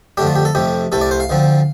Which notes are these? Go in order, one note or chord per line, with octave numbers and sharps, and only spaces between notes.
F2 D3 A3 D4 G4
F4
G4
A4
F2 C3 A3 G4
C2 C3 A3 A4
D5
C5
F5
D2 D3 F3 C4